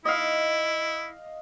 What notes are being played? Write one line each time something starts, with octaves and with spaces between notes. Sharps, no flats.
E4 D#5 F5